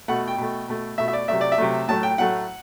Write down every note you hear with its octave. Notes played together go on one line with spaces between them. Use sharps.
B2 A3 F#5
G5
B2 A3
B2 A3
B2 A3 E5
E5
D5
C3 F#3 A3 E5
D5
E5
C3 F#3 A3
A2 F#3 A3 A5
G5
A2 F#3 A3 F#5